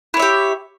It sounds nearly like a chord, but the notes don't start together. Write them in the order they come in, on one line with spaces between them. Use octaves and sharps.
E4 C#5 E5 G4